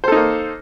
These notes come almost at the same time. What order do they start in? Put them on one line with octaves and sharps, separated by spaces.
C5 A4 D#4 A#3